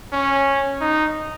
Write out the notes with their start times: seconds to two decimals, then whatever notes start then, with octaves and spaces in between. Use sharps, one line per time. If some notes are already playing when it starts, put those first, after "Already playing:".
0.13 C#4
0.81 D#4